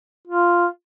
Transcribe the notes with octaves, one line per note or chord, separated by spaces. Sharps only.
F4